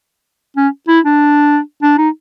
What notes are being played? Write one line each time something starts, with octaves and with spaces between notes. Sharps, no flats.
C#4
E4
D4
D4
D#4